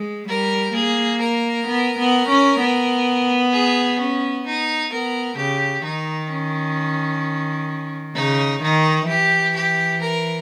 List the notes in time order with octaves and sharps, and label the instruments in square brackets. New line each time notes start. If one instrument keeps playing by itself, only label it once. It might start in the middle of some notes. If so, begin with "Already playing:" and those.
Already playing: [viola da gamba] G#3
[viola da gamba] G3 [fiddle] A#4
[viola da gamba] A#3 [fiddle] G#4
[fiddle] A#4
[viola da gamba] B3
B3
C#4
B3
[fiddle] G#4
C#4
D#4
[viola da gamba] B3 [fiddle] A#4
[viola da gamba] C#3 [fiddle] G4
[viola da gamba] D#3 [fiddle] D#4
[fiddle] C#4
[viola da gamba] C#3 [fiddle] D#4
[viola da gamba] D#3 [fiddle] D#4
[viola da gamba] E3 [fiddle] G4
[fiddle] G4
A#4